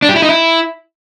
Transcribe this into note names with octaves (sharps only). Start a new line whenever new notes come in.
D4
G4
E4
D#4
E4